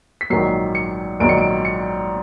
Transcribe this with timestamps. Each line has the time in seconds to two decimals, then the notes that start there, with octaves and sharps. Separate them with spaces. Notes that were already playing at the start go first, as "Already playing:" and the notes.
0.21 B6
0.30 A#1 G#2 D#3 F#3 C7
0.75 C#7
1.20 A#1 G#2 D#3 F#3 D7
1.29 C#7
1.38 D7
1.65 C#7